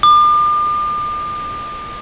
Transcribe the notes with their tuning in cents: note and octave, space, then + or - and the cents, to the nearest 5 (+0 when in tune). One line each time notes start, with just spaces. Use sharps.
D6 +40